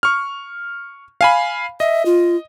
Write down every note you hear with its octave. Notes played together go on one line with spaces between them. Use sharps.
C#6 F6
F5 G#5 B5
D#5 E5
F4